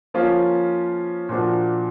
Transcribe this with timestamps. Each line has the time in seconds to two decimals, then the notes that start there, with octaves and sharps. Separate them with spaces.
0.14 F3 A#3 C#4 F4
1.29 A#2 F3 A#3 D4 F#4